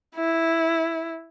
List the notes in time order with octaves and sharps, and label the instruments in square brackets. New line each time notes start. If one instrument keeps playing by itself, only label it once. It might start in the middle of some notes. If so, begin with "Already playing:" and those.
[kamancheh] E4